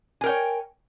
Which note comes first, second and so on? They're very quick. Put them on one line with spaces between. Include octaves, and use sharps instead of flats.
G#5 A#4 G5 C#5